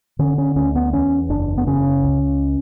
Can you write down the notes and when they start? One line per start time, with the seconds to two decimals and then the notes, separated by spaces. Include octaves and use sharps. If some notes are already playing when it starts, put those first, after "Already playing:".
0.19 D3 C#4
0.38 C#4
0.56 D2 C#4
0.75 B3
0.93 E2 C#4
1.29 F#1 D4
1.58 B3
1.67 C#3 C#4
2.03 C#2